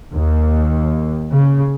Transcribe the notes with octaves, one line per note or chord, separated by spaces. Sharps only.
D#2
C#3